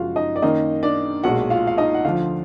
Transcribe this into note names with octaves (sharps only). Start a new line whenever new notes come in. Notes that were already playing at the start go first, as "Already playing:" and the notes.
Already playing: F#1 F#2 F3 G#3 F4 F#4 F5
D#4 D#5
D5
F#2 D#3 A#3 D#4 D#5
D4 D5
B1 A#2 G#3 F#4 F#5
F4 F5
F5
D#4 D#5
F#5
D2 D3 F3 F4 F5